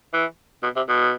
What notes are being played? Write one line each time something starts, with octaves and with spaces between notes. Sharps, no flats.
E3
B2
C3
B2